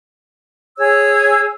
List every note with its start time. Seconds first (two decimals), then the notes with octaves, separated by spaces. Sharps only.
0.78 G#4 C#5 E6